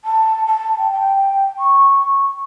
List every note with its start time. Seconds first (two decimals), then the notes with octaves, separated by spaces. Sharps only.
0.04 A5
0.46 A5
0.78 G5
0.92 G5
1.59 C#6